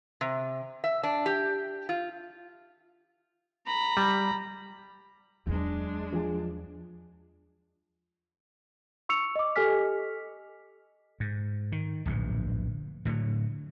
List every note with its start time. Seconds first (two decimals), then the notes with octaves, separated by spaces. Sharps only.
0.21 C3
0.84 E5
1.03 D4
1.26 G4
1.89 F4
3.66 A#5 B5
3.97 G3
5.47 E2 F#3 G#3 D4
6.13 F3 G#4
9.09 C#6 E6 C#7 F7
9.36 D#5 D6
9.56 G4 A4 D#5 G#5 F6 B6
11.20 G#2
11.72 D#3
12.06 D1 A#1 G2
13.05 A2 D3 E3 F#3